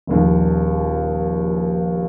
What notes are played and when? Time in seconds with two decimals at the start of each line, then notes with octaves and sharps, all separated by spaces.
0.07 D#1 A#1 D#2